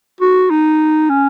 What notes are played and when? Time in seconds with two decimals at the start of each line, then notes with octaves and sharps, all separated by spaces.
0.21 F#4
0.51 D#4
1.09 C#4